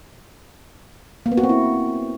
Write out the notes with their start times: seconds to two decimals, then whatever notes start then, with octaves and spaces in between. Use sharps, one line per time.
1.26 A#3
1.32 B3
1.38 F#4
1.43 C4
1.49 E4